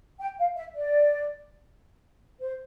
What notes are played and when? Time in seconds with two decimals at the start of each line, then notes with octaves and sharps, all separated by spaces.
0.20 G5
0.38 F5
0.56 E5
0.74 D5
2.40 C5